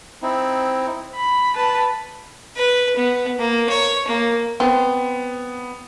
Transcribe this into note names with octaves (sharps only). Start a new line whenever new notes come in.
C4 D#4 E4
B5
B4 A5
B4
B3
A#3
C#5
A#3
B3 C4